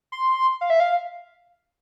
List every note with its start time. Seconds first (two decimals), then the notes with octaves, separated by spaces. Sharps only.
0.12 C6
0.61 F5
0.70 E5
0.80 F5